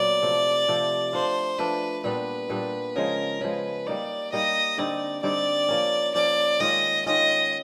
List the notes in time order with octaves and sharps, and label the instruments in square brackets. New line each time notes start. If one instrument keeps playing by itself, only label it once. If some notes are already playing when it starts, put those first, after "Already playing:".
Already playing: [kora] A#2 F#3 B3 [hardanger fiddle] D5
[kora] C3 F3 A3
C3 F3 A3
[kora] F3 A3 D4 F4 [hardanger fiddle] C5
[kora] F3 A3 D4 F4 [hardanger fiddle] B4
[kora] A#2 G3 B3 D4 [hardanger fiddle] B4
[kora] A#2 G3 B3 D4
[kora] C#3 F3 G#3 [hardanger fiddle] A#4
[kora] C#3 F3 G#3 [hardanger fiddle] B4
[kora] G3 A#3 D#4 [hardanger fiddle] D5
[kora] G3 A#3 D#4 [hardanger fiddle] D#5
[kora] D3 G3 C4 D#4 [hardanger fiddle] D5
[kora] D3 G3 C4 D#4 [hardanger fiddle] D5
[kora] F3 A#3 C#4
[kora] F3 A#3 C#4 [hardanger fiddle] D5
[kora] D#3 G#3 C#4 F4 [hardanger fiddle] D#5
[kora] D#3 G#3 C#4 F4 [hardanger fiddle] D#5